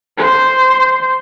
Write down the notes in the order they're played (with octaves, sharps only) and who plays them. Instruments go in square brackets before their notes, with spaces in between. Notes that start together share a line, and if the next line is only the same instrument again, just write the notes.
[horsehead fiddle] C5